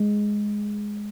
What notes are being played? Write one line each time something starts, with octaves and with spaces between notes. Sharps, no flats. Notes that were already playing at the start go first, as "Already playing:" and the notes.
Already playing: G#3